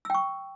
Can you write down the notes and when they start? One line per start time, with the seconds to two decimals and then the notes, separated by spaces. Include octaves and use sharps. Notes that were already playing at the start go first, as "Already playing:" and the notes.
0.05 E6
0.10 G5
0.15 C#6